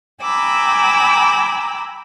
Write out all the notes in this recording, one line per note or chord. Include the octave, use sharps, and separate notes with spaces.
G5 G#5 A#5 B5 D6 E6